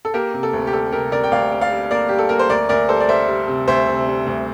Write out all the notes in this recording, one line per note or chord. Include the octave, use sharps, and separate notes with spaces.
A4
A#3 G4 A#4
C3
A4
D2
G4
G3 A4
C3 G4 A#4
C3 A#4 D5
G5
D2 D5 F5
G3
D5 F5
G3
A#3 A#4 D5
G3 G4
A4
A#3 A#4
C5
D2 A#4 D5
D2 A#4 D5
G3 A4 C5
D5
G3 C5 E5
G3
C3
D2 C5 E5
C3
G3
D2